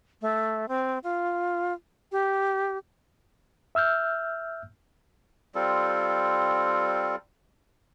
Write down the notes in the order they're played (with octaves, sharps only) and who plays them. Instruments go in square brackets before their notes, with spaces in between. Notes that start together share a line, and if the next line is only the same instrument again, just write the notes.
[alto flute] A3
C4
F4
G4
[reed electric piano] E5 E6 F6 G6
[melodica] G3 C4 F4 A4